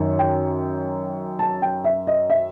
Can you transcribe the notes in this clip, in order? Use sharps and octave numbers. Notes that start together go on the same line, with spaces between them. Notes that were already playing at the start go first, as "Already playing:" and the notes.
Already playing: F#2 D#3
G5
A5
G5
E5
D#5
E5